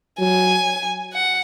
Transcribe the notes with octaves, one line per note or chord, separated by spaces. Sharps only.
F#3 G#5
F#5